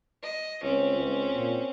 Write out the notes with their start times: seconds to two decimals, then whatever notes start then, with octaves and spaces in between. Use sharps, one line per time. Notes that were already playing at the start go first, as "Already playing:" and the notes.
0.23 D#5
0.63 C#2 C4 C#4
0.96 C#2
1.34 A#2